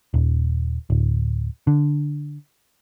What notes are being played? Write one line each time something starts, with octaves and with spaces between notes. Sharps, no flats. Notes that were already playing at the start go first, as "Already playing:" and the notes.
D#1
D1
D3